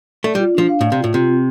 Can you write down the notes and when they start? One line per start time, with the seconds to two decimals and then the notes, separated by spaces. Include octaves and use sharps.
0.24 A3 D5
0.35 G3
0.39 F4
0.55 F3 D4
0.69 F5
0.81 A2
0.84 D5
0.92 C3
0.99 A2 F4
1.14 C3 F4
1.29 C4